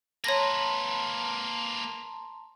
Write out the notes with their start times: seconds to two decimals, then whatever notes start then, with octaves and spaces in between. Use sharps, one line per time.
0.24 A#3 B4 C#5 A5 A#5 C6 A#6